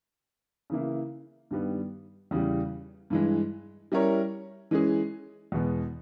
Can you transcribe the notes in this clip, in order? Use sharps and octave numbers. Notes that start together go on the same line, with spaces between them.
C#3 E3 A#3 E4
G2 D#3 G3 B3
E2 C#3 E3 G3
G2 E3 G#3
G3 C#4 E4 A#4 C#5
E3 G#3 C#4 G#4
E2 B2 G#3 B3